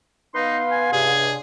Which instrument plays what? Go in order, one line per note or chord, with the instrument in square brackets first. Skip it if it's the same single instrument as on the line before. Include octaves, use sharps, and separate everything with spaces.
[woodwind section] B3 B4 C6 [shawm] D#4 [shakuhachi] F5
[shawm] G#5
[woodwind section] C#2 G2 C3 [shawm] G#4